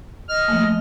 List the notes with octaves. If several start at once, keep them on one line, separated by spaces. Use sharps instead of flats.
D#5 F6
F3 A3 A#3